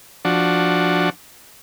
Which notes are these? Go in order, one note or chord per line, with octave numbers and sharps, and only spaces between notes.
F3 D4 F#4